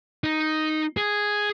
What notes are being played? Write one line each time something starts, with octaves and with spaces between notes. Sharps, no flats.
D#4
G#4